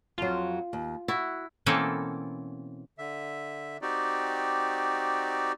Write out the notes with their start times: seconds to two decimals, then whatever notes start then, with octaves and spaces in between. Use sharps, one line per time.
0.18 F2 F#3 F4
0.73 D#2
1.08 E4 F#4
1.66 B2 E3 A#3 C4 C#4 A4
2.98 D3 E5
3.82 C4 D#4 F#4 G4 D5